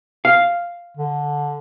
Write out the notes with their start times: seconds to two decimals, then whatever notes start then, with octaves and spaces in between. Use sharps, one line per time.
0.25 F5
0.97 D3